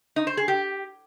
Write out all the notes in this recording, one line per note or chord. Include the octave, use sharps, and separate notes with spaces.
D#4
C5
G#4
G4